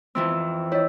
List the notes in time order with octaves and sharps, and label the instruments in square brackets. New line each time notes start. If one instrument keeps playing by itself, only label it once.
[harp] F2 E3 C4 [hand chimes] E6
[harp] E4 [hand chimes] C#5 D#5